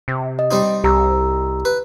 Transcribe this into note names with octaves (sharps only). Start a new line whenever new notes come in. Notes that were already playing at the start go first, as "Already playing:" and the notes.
C3
D#5
G3 C4 D#4
C2 G4 A#5 E6
B4